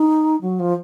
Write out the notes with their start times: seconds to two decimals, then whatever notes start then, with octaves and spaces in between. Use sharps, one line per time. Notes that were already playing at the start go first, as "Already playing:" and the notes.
Already playing: D#4
0.42 F#3
0.60 F3